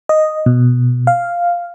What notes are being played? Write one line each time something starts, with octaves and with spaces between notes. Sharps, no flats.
D#5
B2
F5